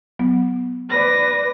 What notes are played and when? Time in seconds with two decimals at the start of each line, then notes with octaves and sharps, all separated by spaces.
0.19 F#3 B3
0.90 B4 D5 A#6